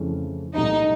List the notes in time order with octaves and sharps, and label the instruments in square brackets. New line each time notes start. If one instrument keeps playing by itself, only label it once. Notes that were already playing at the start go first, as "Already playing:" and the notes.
Already playing: [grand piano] F2 C#3 E3 A3 C#4
[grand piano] C2 A#2 F#3 A3 [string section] D#4